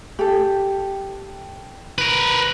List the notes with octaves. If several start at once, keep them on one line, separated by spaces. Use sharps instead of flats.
G4 A4
A#4 B4